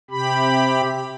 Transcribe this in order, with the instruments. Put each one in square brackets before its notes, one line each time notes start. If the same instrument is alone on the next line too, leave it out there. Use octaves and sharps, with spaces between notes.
[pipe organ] C3 G4 B5